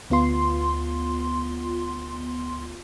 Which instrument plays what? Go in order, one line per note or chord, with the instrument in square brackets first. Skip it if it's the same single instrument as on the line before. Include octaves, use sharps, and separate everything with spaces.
[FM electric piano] D2 B3 F4 C6